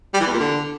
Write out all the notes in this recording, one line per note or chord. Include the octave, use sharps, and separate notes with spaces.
G3
E3
E2
A#2
D3